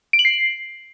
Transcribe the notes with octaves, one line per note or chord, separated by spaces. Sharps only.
D7
F#7
C7